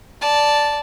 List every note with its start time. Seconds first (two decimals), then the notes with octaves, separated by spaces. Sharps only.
0.21 D5 A5